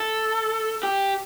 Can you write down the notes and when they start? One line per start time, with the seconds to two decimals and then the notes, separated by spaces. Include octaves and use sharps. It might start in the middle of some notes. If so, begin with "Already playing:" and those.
Already playing: A4
0.83 G4